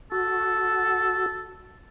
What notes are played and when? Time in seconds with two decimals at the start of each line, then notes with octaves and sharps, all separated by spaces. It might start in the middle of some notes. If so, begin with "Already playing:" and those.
0.12 F#4 A4